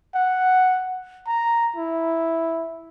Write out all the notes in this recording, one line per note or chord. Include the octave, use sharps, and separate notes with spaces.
F#5
A#5
E4